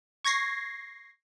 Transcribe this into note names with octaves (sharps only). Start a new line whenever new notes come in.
C#6 G#6 A#6 C7